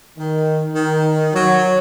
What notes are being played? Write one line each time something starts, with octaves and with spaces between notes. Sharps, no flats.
D#3
D#3
F#3